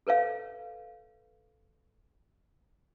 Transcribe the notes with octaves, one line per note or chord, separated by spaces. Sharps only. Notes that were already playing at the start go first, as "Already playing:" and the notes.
A4 B4 C#5 F5